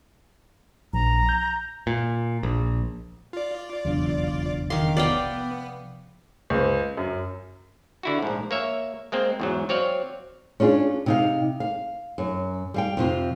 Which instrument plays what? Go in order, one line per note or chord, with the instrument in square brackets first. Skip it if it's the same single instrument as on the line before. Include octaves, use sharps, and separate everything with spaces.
[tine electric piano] A#1 [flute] A#5
[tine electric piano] G6
[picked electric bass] A#2
A#1
[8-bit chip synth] F4 D5
[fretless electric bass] F1 B1 E2 [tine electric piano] C#3 F#3 D4
[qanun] D#3 C6 [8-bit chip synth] F5 D6
[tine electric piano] C3 F3 [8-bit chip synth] B3 [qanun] D5 F5 G5
[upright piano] C#2 C5
F#2
[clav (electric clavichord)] D3 E4 F#4
A#1 G#2
A#3 C#5 E5
G#3 A#3 C4
E2 G#2 F#3
F#3 C4 C#5 D5 F5
[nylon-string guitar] C#4 D4 F4 G#4
C3 D#4 F5
F5
F#2
G3 F5 G5
F2 C3 F4